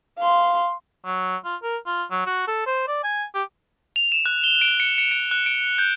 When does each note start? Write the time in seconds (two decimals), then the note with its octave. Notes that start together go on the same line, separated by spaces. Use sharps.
0.18 F5 C6
1.06 F#3
1.45 F4
1.63 A#4
1.86 F4
2.11 F#3
2.26 F#4
2.47 A4
2.67 C5
2.88 D5
3.04 G#5
3.34 G4
3.96 F7
4.12 E7
4.26 F#6
4.44 G7
4.61 D7
4.80 C#7
4.98 C#7
5.11 D7
5.31 F#6
5.46 D7
5.78 G6